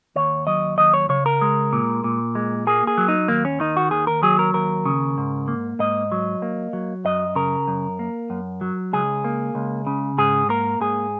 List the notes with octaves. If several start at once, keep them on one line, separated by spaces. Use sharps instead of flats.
D#2 C#5
F#3 D#5
D#2 D#5
C#5
C#3 C#5
A#4
G#3
A#2
A#2
G#3
A#3 G#4
G#4
F#3
D#4
D#2 A#3
C#4
D#3 D#4
F#4
D#2 G#4
A#4
F#3 G#4
A#4
D#2 A#4
C#3
G#2
A#3
G#2 D#5
F#3
A#3
F#3
F#2 D#5
C#3 A#4
F#2
A#3
F#2
F#3
C#2 G#4
A#3
C#2
C#3
G#2 G#4
A#3 A#4
G#2 G#4